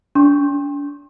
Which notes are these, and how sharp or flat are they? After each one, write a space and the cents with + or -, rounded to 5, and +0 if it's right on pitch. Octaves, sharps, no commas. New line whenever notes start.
D4 -40 C6 +35